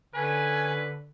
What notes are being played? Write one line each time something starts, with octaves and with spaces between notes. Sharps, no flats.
D3 C#4 A4 B4 G#5